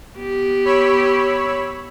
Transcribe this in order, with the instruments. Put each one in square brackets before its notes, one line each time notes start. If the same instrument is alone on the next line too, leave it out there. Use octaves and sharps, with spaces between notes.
[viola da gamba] B3 G4
[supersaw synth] C#5 B5 E6